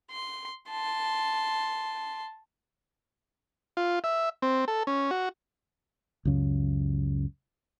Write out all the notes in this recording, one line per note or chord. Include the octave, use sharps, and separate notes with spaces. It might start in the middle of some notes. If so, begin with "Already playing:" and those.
C6
A5 C6
F4
E5
C4
A4
C#4
F#4
C#2 F#2 C#3